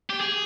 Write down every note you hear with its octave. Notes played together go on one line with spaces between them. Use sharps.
G4
G#4